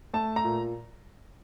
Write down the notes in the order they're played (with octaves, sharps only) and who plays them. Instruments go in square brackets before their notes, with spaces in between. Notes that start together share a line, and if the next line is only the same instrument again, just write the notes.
[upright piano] A3 A5
A#5
A#2